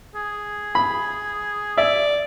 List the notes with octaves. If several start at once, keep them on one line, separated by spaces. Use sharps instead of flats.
G#4
B5
D5 E5